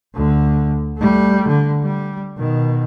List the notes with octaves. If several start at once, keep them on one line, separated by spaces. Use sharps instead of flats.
D2 D3
G3 A3
D3
G3
B2 D#3